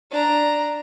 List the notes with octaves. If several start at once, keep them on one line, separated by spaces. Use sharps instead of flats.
D4 A#5